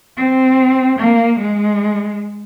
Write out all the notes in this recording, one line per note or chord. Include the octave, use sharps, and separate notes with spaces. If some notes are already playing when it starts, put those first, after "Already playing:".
C4
A#3
G#3